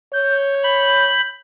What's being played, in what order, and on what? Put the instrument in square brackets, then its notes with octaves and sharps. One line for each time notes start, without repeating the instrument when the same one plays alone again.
[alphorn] C#5 [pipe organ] G6
[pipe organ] B5 G6